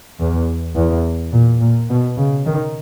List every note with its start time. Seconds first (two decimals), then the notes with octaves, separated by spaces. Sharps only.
0.20 E2
0.76 E2
1.33 A#2
1.61 A#2
1.89 B2
2.18 C#3
2.46 D#3